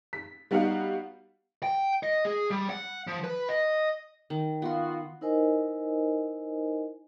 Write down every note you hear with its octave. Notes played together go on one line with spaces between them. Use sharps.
B6
G3 B3 D#4 F#4 F5 F#5
G5
D#5
G#4
G3
F#5
F3
B4
D#5
D#3
B3 F4 F#4 C6
D#4 E4 A#4 C5 D#5 G#5